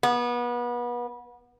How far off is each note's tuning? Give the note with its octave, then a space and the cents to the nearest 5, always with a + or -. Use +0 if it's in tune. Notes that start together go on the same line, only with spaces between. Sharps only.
B3 -30